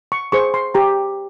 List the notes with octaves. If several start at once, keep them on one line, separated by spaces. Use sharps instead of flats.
C#6
G#4 C5 C#6
C6
G4 A#5